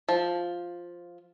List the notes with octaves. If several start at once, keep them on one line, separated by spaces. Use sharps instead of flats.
F3